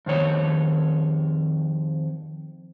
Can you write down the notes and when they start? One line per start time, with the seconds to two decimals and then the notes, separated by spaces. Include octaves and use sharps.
0.06 F2 D#3 C#5